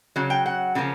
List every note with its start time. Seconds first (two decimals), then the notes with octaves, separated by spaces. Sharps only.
0.16 C#3 F#3
0.30 G5
0.46 F#5
0.75 C#3 F3 A#3 C#4